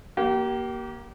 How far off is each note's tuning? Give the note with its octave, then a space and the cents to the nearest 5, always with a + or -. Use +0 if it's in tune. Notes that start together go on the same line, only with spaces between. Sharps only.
A#3 +15 G4 -30